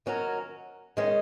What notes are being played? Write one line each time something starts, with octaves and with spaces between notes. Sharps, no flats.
D#3 F#3 C#4 F#4 A#4
D#3 G#3 C#4